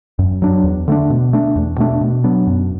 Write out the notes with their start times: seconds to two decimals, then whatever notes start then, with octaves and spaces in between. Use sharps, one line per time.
0.19 F#2
0.42 F#3 D4
0.64 E2
0.88 D3 A3 D4
1.10 B2
1.33 A3 D4
1.56 E2
1.78 B2 A3 D4
2.01 B2
2.24 F#3 B3 D4
2.47 F#2